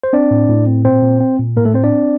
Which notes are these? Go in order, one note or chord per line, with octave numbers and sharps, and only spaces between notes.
C5
C4 D4 D5
A2
A2
C4
A#2 C4 C5
A#2
C4
A#2
A2 A#3 A#4
A3 A4
C4 C5
D4 D5
C4